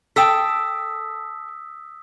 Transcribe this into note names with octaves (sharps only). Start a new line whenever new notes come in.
A4 G5 D#6 E6 B6